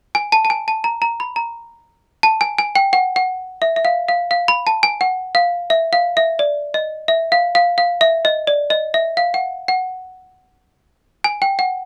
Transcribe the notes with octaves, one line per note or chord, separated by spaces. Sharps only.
G#5
A5
A5
G#5
A5
A#5
A#5
B5
A#5
A5
G#5
G#5
G5
F#5
F#5
E5
E5
F5
F5
F5
B5
A5
G#5
F#5
F5
E5
F5
E5
D5
D#5
E5
F5
F5
F5
E5
D#5
D5
D#5
E5
F5
F#5
F#5
G#5
G5
F#5